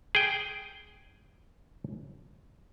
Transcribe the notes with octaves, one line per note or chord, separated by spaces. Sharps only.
G#4 G5